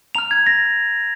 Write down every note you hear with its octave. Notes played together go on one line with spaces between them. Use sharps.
A#5 F6 F7
G#6
A#6